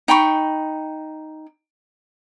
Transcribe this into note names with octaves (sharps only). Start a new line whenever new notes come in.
D#4 G5 B5 C#6